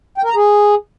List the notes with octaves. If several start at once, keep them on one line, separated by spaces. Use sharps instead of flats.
G5
A#4
A#5
G#4